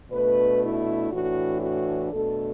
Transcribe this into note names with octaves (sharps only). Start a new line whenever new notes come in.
B2 A3 D4 B4
E4
A2 E3 D4 F#4
F#4
B2 A3 D4 A4